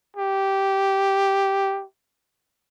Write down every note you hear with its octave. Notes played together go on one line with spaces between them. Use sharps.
G4